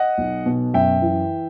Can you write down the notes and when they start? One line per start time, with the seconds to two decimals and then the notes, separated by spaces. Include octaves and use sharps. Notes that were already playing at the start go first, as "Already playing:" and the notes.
Already playing: D#5 F#5
0.18 B1
0.46 B2
0.74 F#2 E5 G5
1.02 E3